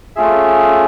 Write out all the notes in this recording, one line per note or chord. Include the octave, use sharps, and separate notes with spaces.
A3 C#4 F4 G#4 E5